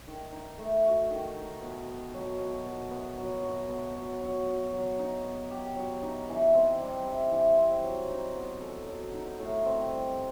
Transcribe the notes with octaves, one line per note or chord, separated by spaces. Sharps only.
D#3
D#4
A3
F#4
D#3
D#4
B2
B3
F#3
B2
B2
B3
F#3
F#4
B3
F#3
F#3
F#4
F#3
D#4
B3
G4
F#3
D#4
E3
C4
G3
E4
E3
C4
F#3
D#4
B3
A4
F#3
D#4
A2
C4
G3